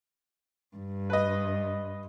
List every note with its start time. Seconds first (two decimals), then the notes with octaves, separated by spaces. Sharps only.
0.77 G2
1.10 B4 D#5